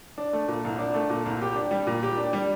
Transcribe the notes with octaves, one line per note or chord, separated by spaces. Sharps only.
D4
A3
A#2
C2
D4
A3
A#2
C2
G4
D4
G3
A#2
G4
D4
G3